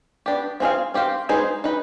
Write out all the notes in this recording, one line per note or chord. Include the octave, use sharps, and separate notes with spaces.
B3 D4 G4
C4 F4 G#4 B4 F5
C4 G4 C5 F5
G#3 B3 D#4 G#4 C5
D#4 B4 D#5